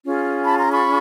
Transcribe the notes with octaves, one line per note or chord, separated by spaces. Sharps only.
C#4 F4 G#4
A5 B5
A#5 C6
B5 C#6